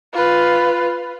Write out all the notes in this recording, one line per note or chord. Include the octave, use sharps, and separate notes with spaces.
F4 B4